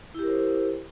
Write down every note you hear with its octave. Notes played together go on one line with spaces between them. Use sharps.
E4 G4 A#4 C5